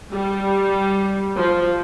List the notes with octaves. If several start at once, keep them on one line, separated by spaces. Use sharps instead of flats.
G3
F3